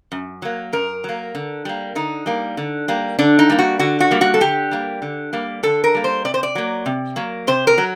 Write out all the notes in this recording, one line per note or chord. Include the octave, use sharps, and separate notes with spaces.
F#2
F#3 A#3
F#2 A#4
F#3 A#3
D3
G3 A#3
D3 D#4
G3 A#3
D3
G3 A#3
D3 D4
D#4
G3 A#3
F#4
D3 F#4
F#4
G3 A#3
F#4
A4
D3 G4
G3 A#3
D3
G3 A#3
D3 A4
A#4
G3 A#3
C5
C3 D5
C5
D5
F#3 A#3
C3
F#3 A#3
C3 C5
A#4
F#3